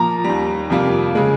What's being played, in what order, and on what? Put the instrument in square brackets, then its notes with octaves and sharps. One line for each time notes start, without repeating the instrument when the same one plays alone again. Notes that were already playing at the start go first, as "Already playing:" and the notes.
Already playing: [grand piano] A#2 F3 A#3 [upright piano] A#5
[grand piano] D#2 D#3 G3
F2 C3 G3 A#3 F4
C#3 G#3